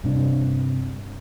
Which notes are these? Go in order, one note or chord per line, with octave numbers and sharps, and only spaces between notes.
G2 C3 D4